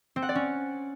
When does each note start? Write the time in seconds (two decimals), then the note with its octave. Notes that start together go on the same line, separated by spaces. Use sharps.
0.16 C4
0.22 F#5
0.29 D5
0.35 C#4